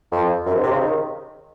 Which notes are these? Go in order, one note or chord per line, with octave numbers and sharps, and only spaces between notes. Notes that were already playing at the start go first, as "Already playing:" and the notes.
F2
F#2
G#2
C3
C#3
D#3